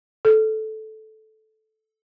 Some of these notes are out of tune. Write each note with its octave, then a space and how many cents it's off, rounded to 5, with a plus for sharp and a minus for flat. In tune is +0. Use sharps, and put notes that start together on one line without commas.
A4 -10